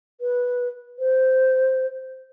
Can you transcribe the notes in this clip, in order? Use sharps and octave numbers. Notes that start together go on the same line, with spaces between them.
B4
C5